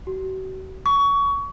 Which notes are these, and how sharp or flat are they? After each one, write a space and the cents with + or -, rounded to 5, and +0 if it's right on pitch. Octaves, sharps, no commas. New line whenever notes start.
F#4 +40
C#6 +25